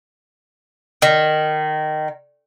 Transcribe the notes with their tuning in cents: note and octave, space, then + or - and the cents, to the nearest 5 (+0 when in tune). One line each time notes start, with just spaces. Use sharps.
D#3 -15